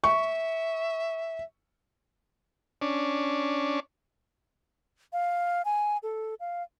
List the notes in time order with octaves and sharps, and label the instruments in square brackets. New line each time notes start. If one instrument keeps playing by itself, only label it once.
[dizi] E5 [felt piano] C#6
[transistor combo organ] C#4 D4
[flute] F5
G#5
A4
F5